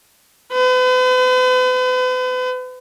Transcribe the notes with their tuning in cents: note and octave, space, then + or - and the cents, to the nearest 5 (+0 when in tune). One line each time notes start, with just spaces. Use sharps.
B4 +45